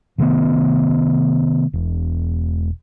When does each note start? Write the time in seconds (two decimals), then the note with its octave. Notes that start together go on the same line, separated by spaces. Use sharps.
0.18 C3 D#3 A3 B3
1.74 E1